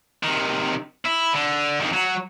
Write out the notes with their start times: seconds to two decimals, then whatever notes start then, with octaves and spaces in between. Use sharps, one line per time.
0.23 C3 D#3
1.05 E4
1.33 D3
1.81 F2 D#3
1.94 F#3 F#4